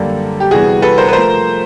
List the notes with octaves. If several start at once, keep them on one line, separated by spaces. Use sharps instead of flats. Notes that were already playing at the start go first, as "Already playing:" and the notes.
Already playing: F#2 D3 G3 A#3 A4
G4
C3 E3 G3 B3 F#4 G#4
A4 B4
A#4 C5
B4
F3 A3 A#4 C5